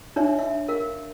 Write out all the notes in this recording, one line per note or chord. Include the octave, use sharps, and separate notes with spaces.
D4 D#4 C#5 E5
E5
A#4 F5